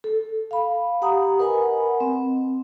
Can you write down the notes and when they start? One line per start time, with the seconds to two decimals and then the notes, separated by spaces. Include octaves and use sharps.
0.04 A4
0.51 F5 B5
1.02 G4 F#5 A#5 D#6
1.39 A#4 B4 D#5 F#5 G#5 B5
2.00 C4